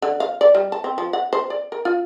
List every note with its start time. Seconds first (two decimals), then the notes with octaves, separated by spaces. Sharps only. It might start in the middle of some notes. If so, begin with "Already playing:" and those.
0.02 D3
0.20 F5
0.41 D5
0.55 G3
0.72 A5
0.84 C4
0.98 F3
1.13 F#5
1.33 C5
1.50 D5
1.72 A#4
1.85 F4